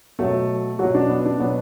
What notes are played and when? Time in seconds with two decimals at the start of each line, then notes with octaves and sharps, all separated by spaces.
0.19 B2 F#3 A3 A4
0.79 B2 F#3 F#4
0.95 D4
1.09 B3
1.25 D4
1.40 B2 F#3 B3